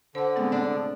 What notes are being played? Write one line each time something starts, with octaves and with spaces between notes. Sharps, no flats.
D3 C5 F#5
A2 G#3 B3 C4 F#5
C3 D4
F3